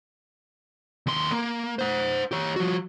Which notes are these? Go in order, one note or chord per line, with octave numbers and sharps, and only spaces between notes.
D#2 C6
A#3
C5 F#5
G4 C#5
F3 F#4